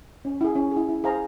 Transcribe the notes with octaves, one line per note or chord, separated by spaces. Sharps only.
C#4
E4 G#4
C#4
G#4
E4
E4
G#4 C5 F5 A#5